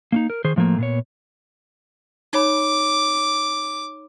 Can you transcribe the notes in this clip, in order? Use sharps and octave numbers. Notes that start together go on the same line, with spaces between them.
A#3 C#4 D#4
A#4
D#3 G#4 C5
A2 F3 A3 A#3
A#2 B3 C#5
D#4 C#5 B5 D6